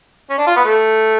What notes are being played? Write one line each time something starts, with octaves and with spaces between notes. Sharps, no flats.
C#4
D4
F4
B3
A3